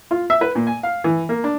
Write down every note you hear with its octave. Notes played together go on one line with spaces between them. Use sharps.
F4
E5
B4
A#2
G#5
F5
E3
A#3
D4